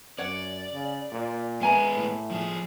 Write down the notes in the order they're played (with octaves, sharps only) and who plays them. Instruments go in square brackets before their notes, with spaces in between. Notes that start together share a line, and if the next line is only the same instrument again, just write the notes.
[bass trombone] F#2 [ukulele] C#5 F#5 [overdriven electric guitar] D5
[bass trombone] C#3
A#2
[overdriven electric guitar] G#3 B3 [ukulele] E5 G#5 A#5
[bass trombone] A2
[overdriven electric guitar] F3 G#4